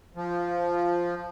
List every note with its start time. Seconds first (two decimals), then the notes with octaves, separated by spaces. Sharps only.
0.15 F3